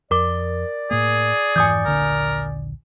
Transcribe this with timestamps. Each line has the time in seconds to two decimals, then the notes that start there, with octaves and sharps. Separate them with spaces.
0.11 F2 A#4 D5 D6
0.91 A2 A#3 G#4
1.56 F2 G#2 E3 G#5 D#6 G6
1.85 D#1 A#1 D3 A#4